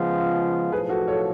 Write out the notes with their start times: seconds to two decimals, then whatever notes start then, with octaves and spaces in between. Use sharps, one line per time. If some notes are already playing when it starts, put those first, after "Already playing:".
Already playing: C#3 F3 G#3 B3 F4
0.72 B1 A2 F3 G#4 B4
0.89 F#4 A4
1.07 A4 C#5